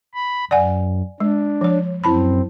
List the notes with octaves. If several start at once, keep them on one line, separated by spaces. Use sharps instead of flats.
B5
F#2 D5 F#5 G#5
G#3 D4
F3 C#5
F#2 C4 E4 A5 B5